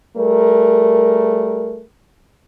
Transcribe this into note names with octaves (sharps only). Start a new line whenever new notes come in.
G3 A3 G#4 A#4